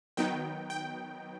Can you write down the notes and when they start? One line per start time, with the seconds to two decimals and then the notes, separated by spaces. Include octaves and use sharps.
0.17 D#3 F#3 B3 D#4 G5
0.70 G5